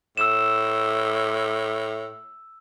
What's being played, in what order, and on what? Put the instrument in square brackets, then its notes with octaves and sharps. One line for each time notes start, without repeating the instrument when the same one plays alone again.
[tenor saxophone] A2 [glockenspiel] E6 E7